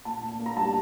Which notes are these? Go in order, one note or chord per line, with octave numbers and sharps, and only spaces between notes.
A#2 A5
A#2
A#3
A#5
G3 A5